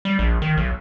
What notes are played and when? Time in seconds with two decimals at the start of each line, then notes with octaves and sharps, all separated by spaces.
0.05 G3
0.19 A#1
0.42 D#3
0.57 B1